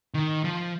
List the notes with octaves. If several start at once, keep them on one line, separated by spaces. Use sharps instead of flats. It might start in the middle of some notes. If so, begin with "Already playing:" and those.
D#3
F3